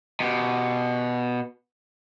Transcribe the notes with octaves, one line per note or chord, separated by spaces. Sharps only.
B2 G4